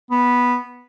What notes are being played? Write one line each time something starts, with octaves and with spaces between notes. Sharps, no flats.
B3